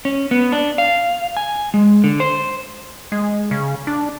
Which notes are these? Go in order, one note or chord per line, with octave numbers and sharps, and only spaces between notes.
C#4
B3
D4
F5
G#5
G#3
D3
C5
G#3
C#3
D4